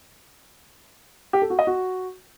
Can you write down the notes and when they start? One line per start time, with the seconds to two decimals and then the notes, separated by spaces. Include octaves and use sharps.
1.33 G4
1.42 A4
1.50 F#4
1.59 D#5
1.67 F#4